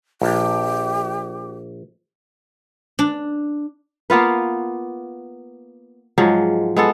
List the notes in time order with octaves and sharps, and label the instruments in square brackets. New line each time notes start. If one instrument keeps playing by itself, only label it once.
[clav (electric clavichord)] A#1 [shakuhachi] G4
[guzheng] D4
[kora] A#3 B3 F4 B4
G#2 F3 F#3 G#3
G#3 B3 A4